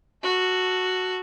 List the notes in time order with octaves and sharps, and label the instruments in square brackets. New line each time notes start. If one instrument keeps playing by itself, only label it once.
[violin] F#4 A4